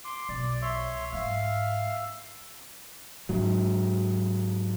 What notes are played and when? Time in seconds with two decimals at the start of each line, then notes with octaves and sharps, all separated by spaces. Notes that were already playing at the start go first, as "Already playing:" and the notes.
0.05 C6 D6
0.29 B1 D5
0.62 C#5 E5 C6
1.13 G#2 E5 F5 F6
3.29 G#2 F#3